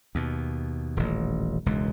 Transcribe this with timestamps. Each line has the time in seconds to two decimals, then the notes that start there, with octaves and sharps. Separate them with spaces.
0.15 D#2 B2
0.97 D#1 A1
1.66 E1 C#2 G#2